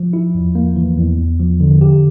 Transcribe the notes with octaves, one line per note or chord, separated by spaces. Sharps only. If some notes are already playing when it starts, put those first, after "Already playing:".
Already playing: F3
E4
E2
A#3
E3
E2
E2
F3
D3
G4